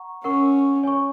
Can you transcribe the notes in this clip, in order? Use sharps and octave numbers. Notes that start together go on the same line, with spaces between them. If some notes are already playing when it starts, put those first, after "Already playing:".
Already playing: F#5 A#5 C#6
C#4 A#4 F#5 C#6
C#5 G#5 C#6